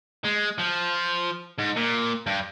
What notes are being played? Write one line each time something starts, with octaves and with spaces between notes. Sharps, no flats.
G#3
F3
G#2
A#2
G2